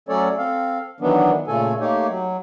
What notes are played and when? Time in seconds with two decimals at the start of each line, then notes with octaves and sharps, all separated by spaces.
0.09 F#3 A3 C#4 A4 C#5 D5
0.38 C4 A4 F5
1.00 D#3 E3 F#3 B3 D4
1.48 A#2 C#3 A3 A4 G#5
1.80 A3 A#3 D#4 G4 C#5
2.09 F#3